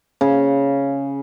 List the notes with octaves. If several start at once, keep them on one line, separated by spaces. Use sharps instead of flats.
C#3